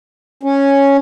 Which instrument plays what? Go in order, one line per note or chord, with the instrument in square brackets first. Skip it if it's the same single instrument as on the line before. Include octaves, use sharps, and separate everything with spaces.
[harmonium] C#4